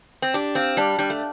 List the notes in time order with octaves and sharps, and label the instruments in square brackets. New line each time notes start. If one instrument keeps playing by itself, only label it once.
[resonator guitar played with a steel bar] C4
[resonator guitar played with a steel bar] D4 [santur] G4
[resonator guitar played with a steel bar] C4 [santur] F5
[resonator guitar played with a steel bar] G3 [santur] D4
[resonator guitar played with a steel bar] G3 [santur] D4
[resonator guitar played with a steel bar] A3